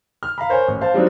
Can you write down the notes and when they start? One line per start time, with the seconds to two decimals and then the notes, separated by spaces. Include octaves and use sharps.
0.23 F6
0.38 F5 A#5 B5
0.49 A#4 C5 C#5 G#5
0.68 A1
0.81 C5 F5 A5
0.94 F#3 G3 C4 D4 D#4